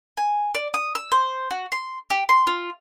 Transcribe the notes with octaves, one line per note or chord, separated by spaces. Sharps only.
G#5
D5
D#6
E6
C5
F#4
C6
G4
C6
F4